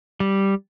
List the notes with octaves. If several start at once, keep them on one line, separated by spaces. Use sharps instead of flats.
G3